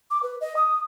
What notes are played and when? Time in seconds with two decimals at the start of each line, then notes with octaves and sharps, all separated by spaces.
0.11 D6
0.23 B4
0.41 D#5
0.57 D#6